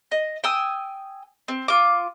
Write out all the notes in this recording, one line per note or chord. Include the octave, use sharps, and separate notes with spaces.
D#5
G5 G#5 D#6 E6
C4
F4 D6